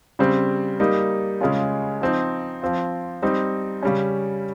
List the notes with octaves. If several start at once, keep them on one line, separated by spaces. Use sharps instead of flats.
C#3 G3 C4
G3 A#3 D#4
C#3 G#3 C#4 F4
F3 C4 D#4
F3 C4 F4
G3 C4 D#4
C#3 G3 C#4